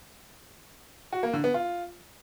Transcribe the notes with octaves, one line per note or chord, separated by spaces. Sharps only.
F#4
A#3
D3
B3
F4